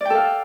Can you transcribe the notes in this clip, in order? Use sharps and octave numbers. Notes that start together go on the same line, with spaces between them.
A4 D5 F5 G5